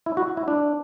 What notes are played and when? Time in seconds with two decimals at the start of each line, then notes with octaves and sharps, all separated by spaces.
0.06 E4
0.17 F#4
0.37 E4
0.48 D4